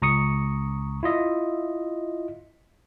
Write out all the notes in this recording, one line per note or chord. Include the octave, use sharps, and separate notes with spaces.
C#2 A#5 C#6 D#6 C#7
E4 F4 D#5 E5